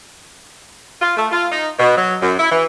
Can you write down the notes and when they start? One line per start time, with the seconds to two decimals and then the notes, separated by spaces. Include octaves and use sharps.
1.00 F4
1.17 A3
1.31 F4
1.52 D#4
1.78 B2
1.96 F#3
2.21 F#2
2.38 E4
2.50 E3